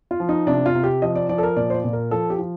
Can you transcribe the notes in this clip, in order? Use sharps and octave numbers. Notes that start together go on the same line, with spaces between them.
F4
F3
D#4
C3 D4
F4
C3
G4
F3 D#5
D5
F3 D5
A4
A#4
A#2 D5
C5
D5
A#2
A#4
F3 A4
G4
F3